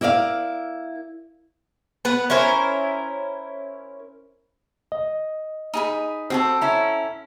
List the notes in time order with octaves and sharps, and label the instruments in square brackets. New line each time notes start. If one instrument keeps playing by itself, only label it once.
[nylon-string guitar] E4 A#4 D5 D#5 F5
[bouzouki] B3 B4
C#4 E4 A#4 C5
[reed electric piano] D#5
[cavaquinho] D#4 G#4 B5
[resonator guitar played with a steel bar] C4 [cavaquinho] F#4 G#4 A4 [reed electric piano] C5
[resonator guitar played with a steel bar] C#4 E4 [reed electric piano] A#5